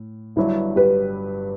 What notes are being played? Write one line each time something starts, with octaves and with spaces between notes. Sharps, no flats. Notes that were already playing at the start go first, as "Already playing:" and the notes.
Already playing: A2
G1 G2 F#3 E4
G4 B4